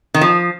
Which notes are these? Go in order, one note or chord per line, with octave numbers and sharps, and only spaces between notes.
D#3
F3